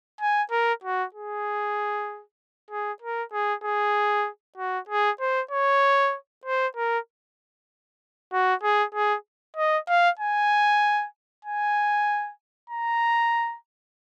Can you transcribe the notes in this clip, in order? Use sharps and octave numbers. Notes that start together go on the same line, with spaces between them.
G#5
A#4
F#4
G#4
G#4
A#4
G#4
G#4
F#4
G#4
C5
C#5
C5
A#4
F#4
G#4
G#4
D#5
F5
G#5
G#5
A#5